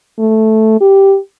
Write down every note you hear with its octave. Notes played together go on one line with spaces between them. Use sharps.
A3
G4